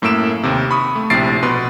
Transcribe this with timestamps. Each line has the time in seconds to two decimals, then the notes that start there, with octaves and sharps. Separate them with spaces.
0.02 F#2 A2 A#3 E6 D7 E7
0.43 D#2 C3
0.71 B5 C#6 D#6
0.96 A3
1.10 A#1 A2 C3 A6 C7 D7
1.43 B2 B4 C6